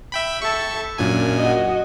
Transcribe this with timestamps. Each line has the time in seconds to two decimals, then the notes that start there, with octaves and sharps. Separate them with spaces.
0.12 E5 G5 B5
0.42 A4 E5 A5 C#6
0.98 F#2 A#2 D4 G#5
1.38 F#4 D#5